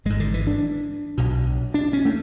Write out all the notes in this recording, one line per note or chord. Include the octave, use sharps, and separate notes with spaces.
G#1 G#2 G#3
D3
E3
D4
B1 B2
D4
C#4
A3